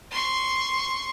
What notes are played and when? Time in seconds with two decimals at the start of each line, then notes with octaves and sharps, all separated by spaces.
0.11 C6 C#6